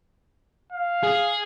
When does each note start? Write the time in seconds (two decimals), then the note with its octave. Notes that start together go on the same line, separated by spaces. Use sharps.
0.72 F5
1.03 G#4